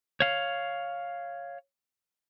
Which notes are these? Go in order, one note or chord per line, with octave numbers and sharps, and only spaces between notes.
C#5 F5